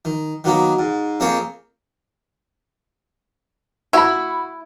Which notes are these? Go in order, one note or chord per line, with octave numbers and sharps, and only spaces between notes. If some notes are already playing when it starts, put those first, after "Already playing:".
D#3
D#3 F#3 A#3 B3
G#2
F2 A#3 C4 G#4 C#5
E4 F#4 B5